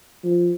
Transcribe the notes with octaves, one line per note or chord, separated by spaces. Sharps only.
F3